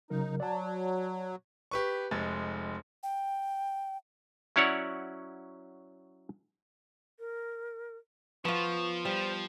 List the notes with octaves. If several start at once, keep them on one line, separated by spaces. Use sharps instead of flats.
C#3 F#3 D#4 A#4
F#3 D5 A5
G4 B4 C#6
F1 G#3 A6
G5
F#3 C#4 E4 C#5 D5 F#5
A#4
F3 B3 F4 C#6
F3 G3 C5